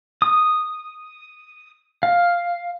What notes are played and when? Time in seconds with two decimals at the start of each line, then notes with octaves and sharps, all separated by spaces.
0.22 D#6
2.03 F5